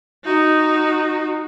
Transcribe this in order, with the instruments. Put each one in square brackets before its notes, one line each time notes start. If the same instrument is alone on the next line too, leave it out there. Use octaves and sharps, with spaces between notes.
[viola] D#4 F#4